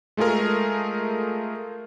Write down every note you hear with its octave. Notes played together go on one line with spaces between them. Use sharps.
G#3 A3 F4 G#4 A#4